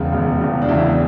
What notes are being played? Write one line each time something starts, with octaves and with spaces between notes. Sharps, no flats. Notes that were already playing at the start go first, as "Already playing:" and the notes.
Already playing: E1 E2 C#3
E1 E2 C#3
E1 E2 C#3
D4
E1 E2 C#3 E4